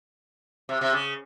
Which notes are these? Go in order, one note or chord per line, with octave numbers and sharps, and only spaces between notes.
C3
C3
C#3